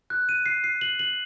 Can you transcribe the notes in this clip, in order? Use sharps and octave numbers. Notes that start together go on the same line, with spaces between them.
F#6
D#7
C7
C7
F#7
F#7